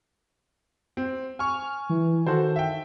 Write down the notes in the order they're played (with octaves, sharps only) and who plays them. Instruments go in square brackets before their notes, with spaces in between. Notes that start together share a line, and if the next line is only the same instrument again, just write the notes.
[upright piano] C4
[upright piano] G#5 C#6 [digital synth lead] F6
[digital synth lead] E3
[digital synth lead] D#3 [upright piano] F#4 A4 C5
[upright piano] E5 G5